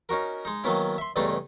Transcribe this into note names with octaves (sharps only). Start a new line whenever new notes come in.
C#4 D#4 F#4 A#4
G#3 D#4
D#3 F#3 A#3 B3 C#4 E4
E5 C6
E2 G2 C#3 A3 D4 D#4